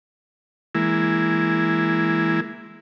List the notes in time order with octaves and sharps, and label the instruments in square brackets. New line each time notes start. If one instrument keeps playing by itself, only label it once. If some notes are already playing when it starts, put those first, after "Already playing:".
[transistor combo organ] E3 G#3 A#3 E4